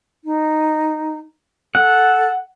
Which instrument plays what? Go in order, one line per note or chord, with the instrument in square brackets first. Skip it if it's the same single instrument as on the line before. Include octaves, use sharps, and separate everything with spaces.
[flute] D#4
[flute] A4 [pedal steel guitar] F#5